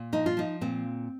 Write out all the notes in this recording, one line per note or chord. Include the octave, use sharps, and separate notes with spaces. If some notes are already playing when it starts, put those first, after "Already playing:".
Already playing: A#2
F3 D#4
F4
F3 D#4
A#2 C4